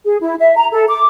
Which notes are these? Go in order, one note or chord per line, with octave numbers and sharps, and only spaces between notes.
G#4
E4
E5
A#5
A4
D6